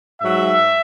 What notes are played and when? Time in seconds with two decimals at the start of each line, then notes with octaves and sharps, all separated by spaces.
0.21 G#2 F#3 E5